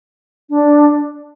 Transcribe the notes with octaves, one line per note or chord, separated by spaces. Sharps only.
D4